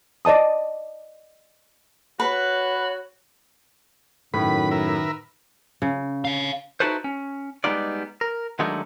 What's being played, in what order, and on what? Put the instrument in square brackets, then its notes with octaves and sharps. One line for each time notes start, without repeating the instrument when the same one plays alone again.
[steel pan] D5 D#5 A5 D#6
[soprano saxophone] F#4 [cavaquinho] B4 [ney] C#5
[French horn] F#2 [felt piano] A2 [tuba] D#3 [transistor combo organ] B4 B5
[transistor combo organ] A#4 B4 E5
[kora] C#3
[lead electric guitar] C#5 F5
[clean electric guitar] D#4 E4 F#4 A4 B4 C5
C#4
G3 G#3 B3 D#4 F4 D5
A#4
D#3 F#3 G#3 A3 D4 D#4